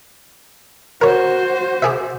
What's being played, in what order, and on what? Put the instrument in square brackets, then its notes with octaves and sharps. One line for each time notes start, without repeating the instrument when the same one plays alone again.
[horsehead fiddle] F#4 C5 [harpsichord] A#4 C#5
[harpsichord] G4 G#4 E5